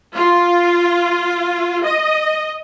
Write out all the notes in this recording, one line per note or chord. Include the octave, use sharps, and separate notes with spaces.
F4
D#5